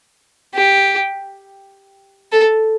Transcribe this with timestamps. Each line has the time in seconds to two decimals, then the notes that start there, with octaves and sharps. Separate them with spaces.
0.54 G4
2.32 A4